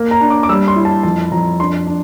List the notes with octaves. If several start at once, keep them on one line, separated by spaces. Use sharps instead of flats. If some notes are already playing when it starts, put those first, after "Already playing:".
Already playing: A#3
A#5
D4
D6
D6
G3 E6
C6
E4
A5
F2 A5
F2 A#5
D4 C6
D4